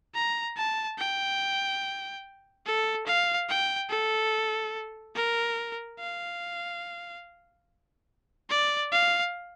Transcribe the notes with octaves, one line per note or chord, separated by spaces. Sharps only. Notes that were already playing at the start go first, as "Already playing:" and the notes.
A#5
A5
G5
A4
F5
G5
A4
A#4
F5
D5
F5